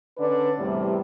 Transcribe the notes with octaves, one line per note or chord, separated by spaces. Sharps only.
D3 C#4 D4 B4 D5
E2 A2 C3 G3